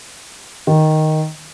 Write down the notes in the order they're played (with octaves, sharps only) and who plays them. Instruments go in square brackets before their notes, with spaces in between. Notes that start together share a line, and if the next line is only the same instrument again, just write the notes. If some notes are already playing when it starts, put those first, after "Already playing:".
[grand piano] D#3